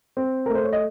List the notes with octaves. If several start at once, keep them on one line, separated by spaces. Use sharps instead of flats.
C4
A3 A#4
C5
C#5
D#5